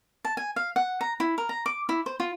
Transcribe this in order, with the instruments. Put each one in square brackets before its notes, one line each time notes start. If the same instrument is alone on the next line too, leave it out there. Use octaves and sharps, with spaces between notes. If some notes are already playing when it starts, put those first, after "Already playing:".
[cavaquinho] A5
G#5
F5
F#5
A#5
E4
A#4
A#5
D6
E4
C5
F4